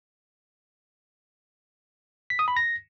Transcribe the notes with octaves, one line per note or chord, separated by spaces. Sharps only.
B6
D#6
B5
A#6